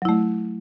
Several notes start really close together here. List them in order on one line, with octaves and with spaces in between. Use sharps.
F#3 E4 A3